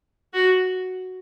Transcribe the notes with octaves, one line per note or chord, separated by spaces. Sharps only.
F#4